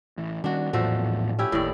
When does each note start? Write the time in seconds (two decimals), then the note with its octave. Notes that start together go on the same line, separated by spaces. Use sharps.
0.18 A1 E3
0.44 D#3 G3 C#4 D4 F#4
0.73 A#1 E2 A2 F3 F#3 A3 F#4
1.39 C#4 E4 G4
1.52 G1 D#2 A2 D5